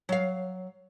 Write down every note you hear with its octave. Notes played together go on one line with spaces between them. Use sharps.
F#3 F5